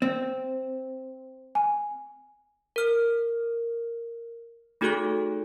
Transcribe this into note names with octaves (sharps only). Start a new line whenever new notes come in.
C4
G#5
A#4 F6
A3 D#4 F#4 G#4 A4 F#6